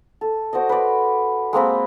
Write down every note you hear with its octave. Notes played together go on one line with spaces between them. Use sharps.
A4
F#4 C5 D5 D#5
B4 D5
G#3 A#3 C4 B5